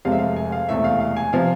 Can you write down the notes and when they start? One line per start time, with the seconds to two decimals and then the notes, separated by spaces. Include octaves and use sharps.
0.05 F1 F2 C3 G#3 F5
0.12 E5
0.19 F5
0.36 G#5
0.52 F5
0.69 E1 E2 C3 E3 A3 E5
0.84 F5
1.00 F5
1.17 G#5
1.33 C3 F3 F5